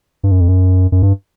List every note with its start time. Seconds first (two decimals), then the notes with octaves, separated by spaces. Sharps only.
0.23 G2
0.31 F#2
0.41 F2
0.48 F#2
0.92 F#2
1.03 G2